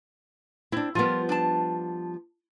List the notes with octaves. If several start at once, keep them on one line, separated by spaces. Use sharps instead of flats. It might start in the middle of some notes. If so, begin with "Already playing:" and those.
C4 D4 E4
F3 G3 B3 F4 A#4
D4 A5